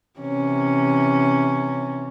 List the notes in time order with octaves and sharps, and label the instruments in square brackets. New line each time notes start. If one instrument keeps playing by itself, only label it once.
[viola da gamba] C3 E3 C#4